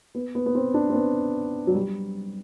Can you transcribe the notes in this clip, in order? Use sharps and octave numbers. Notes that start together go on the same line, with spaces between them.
B3
B3
B3
C4
D4
C4
B3
F#3
G3